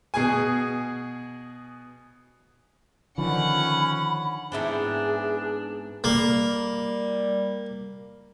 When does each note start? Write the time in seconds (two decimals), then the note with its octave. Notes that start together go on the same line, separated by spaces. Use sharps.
0.14 B2 G#4 G#5
3.18 D3 D#3 F3 C#4 F#5 B5
4.52 G#2 B3 C4 D4 E4 G#4 G5
6.04 G3 A#3